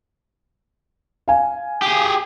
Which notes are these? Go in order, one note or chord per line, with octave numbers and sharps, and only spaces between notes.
F5 G#5
G4 G#4